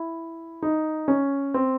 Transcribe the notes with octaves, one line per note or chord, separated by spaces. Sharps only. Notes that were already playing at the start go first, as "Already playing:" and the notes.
Already playing: E4
D#4
C#4
C4